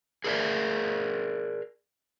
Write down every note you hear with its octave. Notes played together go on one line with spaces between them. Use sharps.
G#4 A#4 D5 E5